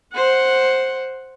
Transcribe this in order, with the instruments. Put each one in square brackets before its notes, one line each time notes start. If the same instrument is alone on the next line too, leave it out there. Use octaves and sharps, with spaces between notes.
[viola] C5 F#5